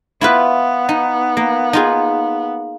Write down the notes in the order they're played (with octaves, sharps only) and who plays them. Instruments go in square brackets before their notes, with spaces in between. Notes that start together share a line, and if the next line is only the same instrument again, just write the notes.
[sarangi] B3 [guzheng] E4 F4 B4
[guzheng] D#4
A#3
D#4 F4 G#4